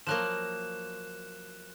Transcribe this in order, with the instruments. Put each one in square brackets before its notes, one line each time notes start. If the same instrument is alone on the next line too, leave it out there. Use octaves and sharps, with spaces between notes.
[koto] F3 F#3 A#3 [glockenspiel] F#6 E7